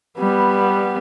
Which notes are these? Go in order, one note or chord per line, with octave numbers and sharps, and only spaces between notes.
G3 B3